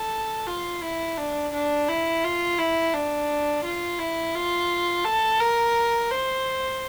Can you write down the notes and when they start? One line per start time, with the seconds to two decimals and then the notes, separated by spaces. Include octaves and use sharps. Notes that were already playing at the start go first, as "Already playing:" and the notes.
Already playing: A4
0.47 F4
0.83 E4
1.18 D4
1.53 D4
1.89 E4
2.24 F4
2.58 E4
2.94 D4
3.64 F4
3.99 E4
4.35 F4
5.05 A4
5.40 A#4
6.11 C5